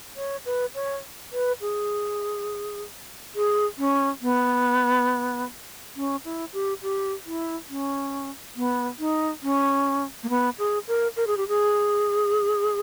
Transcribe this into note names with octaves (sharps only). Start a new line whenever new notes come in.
C#5
B4
C#5
B4
G#4
G#4
C#4
B3
C#4
E4
G4
G4
E4
C#4
B3
D#4
C#4
A#3
B3
G#4
A#4
A#4
G#4
G4
G#4